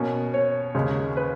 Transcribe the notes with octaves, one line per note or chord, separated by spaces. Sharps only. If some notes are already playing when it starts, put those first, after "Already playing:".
Already playing: B2 A#3 C#4
C#5
D#2 C#3 G#3 D#4
B4